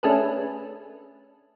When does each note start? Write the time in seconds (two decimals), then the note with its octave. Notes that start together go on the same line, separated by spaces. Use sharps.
0.03 A3 C#4 D4 G#4 A4 B4